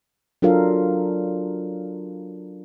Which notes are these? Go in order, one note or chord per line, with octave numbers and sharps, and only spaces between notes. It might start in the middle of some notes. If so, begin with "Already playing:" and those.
F#3 D4 F4 A4 A#4 F5